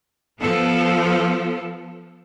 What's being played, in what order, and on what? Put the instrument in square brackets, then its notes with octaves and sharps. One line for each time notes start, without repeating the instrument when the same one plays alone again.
[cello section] F3 B3 A4